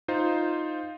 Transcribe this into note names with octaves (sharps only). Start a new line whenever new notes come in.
D#4 F4 C5